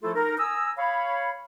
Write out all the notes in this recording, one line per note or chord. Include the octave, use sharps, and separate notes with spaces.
F3 A3 E4 F4 A4
D#4 A#4
G#5 A#5 D#6 E6
C#5 F5 B5